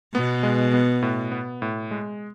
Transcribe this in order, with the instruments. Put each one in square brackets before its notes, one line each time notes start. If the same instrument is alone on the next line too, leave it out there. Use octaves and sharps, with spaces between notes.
[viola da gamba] B2 [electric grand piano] B3
[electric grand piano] G#3
B3
A2
B3
A2
G#3